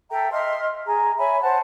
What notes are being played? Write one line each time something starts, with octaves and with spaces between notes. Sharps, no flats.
A4 E5 G5 A#5
D#5 E5 C6 F6
G#4 G#5 A#5
C#5 E5 G#5 B5
C5 F#5 A5